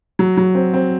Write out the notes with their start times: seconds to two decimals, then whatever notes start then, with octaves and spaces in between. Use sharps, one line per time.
0.19 F#3
0.37 F#3
0.55 C4
0.74 C4